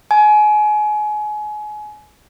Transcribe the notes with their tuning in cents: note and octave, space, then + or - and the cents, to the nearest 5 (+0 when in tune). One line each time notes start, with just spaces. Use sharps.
G#5 +30